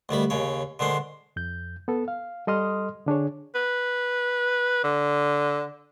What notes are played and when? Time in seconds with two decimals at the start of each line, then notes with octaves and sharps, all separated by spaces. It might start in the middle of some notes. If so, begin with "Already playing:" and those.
0.09 D2 D#3 G3 B5
0.30 D#2 C#3 C#5
0.79 D3 D#3 G#3 C5
1.36 F2 G6
1.88 B3 A4
2.08 F5
2.47 G3 A4 D#5 C6 D#6 F6
3.06 D3 D4 G#4 C#5
3.55 B4
4.84 D3